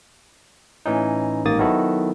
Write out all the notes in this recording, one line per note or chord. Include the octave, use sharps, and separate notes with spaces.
A2 E3 C#4 D#4
A1 G#2 D#3 A#3 D#6 A6
D#3 F#3 B3 E4 F#4 A4